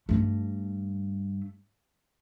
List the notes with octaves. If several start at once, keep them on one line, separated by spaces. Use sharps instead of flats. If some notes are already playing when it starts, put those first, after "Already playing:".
G2 A3